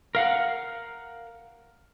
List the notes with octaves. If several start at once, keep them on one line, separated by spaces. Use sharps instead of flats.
A#4 F5 F#5